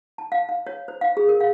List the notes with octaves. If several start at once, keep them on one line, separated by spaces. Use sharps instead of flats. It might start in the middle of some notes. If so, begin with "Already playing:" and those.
A5
F5
F5
C#5
C5
F5
G#4
A#4
F5